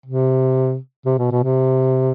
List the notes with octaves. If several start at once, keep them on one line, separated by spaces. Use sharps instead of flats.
C3
C3
B2
B2
C3